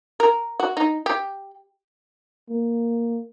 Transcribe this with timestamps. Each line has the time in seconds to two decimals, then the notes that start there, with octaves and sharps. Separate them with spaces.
0.20 A#4
0.60 F#4
0.77 D#4
1.06 G4
2.49 A#3